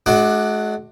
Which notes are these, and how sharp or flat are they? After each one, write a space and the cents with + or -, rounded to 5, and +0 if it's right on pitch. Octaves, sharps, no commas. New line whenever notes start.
G#3 +45 D4 +15 F#4 +0